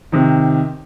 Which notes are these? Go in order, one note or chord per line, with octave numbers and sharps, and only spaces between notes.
C3 D#3